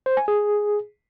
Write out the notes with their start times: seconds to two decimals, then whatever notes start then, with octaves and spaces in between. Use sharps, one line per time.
0.06 C5
0.17 G#5
0.28 G#4